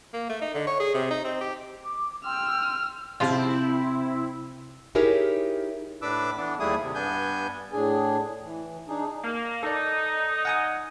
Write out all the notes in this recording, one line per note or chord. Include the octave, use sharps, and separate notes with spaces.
A#3
A3
D#4
D3
C#5
G#4
C3
D#4
C4
G4
D6
G5 C6 E6 F6
C3 F3 C4 E4 F4
D#4 E4 G4 G#4 A#4 C#5
A2 D4 B4 D6 E6
E3 B3 D4
D#2 G3 A3 E4 G#4 D#6
C3
G2 B3 D4 G#5 G6
A2 D4 G#4 G#5
E3
D4 D#4 G#4
A#3
D#4 A4 D5
F#5 G#5 D#6